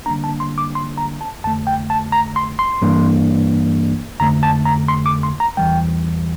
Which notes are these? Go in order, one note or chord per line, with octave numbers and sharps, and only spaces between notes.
D3 G3 A#3 D4 A#5
A5
C6
D6
C6
A#5
A5
F2 D3 A3 A5
G5
A5
A#5
C6
C6
G2 E3 G3 A#3 D4
F2 D3 A3 A#5
A5
A#5
C6
D6
C6
A#5
E2 E3 G3 G5